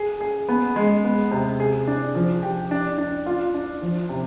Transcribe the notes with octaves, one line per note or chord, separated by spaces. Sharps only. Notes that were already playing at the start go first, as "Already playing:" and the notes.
Already playing: G#4
G#4
B3
G#3
B3
C3
G#4
D4
F3
G4
D4
D4
F4
D4
F3
C3